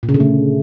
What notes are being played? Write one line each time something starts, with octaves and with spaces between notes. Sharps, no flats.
A#2
C#3
D3
A3